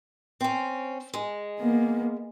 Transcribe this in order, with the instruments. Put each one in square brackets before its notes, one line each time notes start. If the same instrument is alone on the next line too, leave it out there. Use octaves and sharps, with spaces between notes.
[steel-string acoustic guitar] C4 C#4
G#3
[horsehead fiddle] A#3 B3